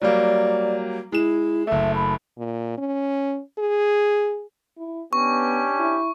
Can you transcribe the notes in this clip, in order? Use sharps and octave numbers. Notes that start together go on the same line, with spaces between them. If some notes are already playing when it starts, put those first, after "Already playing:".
F#3 G3 A#3 D5
G#3 E4 E7
F#1 A3 E5
B5
A#2
C#4
G#4
E4
B3 C#4 D4 G4 C#6
E4